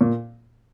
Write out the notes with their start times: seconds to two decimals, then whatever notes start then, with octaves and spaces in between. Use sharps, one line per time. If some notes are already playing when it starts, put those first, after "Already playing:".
0.01 A#2